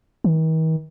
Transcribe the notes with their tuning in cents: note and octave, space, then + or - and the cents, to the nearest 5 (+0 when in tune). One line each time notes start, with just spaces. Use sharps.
D#3 +45